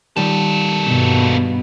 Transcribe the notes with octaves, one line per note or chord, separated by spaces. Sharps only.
D#3 G3 A#3 A4
G2 B2